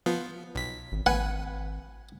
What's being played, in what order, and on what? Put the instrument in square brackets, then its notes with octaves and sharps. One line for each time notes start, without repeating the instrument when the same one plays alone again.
[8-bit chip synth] F3 B3 F4
B1 B6
[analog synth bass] G#1
[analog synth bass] G#1 [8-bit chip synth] B4 G#5 [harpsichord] F#5